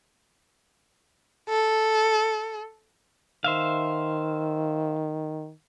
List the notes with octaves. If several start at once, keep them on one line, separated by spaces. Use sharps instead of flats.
A4
D#3 C5 E5 F5